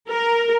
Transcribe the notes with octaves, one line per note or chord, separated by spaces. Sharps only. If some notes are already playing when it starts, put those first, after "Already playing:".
A#4